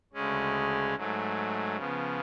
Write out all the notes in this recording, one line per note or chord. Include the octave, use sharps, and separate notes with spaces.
D2 C#3 G#3 C#4
G#2 F#3 A3
C#3 F3 B3